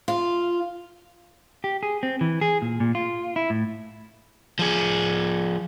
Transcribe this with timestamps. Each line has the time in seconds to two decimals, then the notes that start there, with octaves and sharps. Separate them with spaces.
0.08 F4
1.64 G4
1.83 G#4
2.03 C4
2.21 E3
2.41 G#4
2.62 A#2
2.80 A#2
2.95 F4
3.36 E4
3.50 A2
4.59 F3 G#4